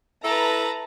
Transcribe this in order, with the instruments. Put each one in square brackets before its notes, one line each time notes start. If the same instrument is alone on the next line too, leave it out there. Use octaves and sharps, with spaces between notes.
[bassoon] E4 [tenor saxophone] A4 [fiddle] B4 A5 [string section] A#5